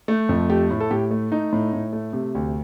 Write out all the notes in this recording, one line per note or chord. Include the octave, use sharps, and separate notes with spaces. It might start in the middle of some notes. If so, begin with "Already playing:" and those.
A3
F2
A3 G4
A2
A4
A2 G4
A3
A3 D#4
A2
A2
A3
C3
D2